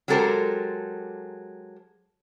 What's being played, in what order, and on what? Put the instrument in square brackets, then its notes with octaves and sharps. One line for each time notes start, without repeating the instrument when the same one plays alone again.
[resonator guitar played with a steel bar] F#3 G#3 G4 A4 A#4 C5